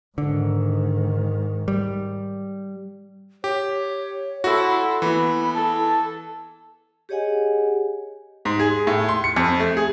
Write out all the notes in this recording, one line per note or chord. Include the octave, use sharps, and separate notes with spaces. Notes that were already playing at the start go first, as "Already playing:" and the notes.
G#2 D3 D#3
G3
G4 C#5
E4 F#4 A4 C6
E3 B3 E4 B5
A4 A5
G4 G#4 C#5 D#5 F#5 G#5
G#2
G#4
A2
C6
C#7
F2
A3
G#4